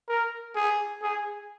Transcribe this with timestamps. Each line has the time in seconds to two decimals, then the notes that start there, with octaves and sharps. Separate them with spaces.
0.09 A#4
0.56 G#4
1.02 G#4